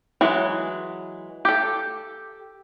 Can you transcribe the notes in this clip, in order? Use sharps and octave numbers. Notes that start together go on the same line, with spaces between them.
E3 F#3 G#3
G4 A4